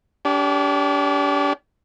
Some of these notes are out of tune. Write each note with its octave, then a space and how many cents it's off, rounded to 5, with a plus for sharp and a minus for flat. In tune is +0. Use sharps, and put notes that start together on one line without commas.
D4 -40 G4 -5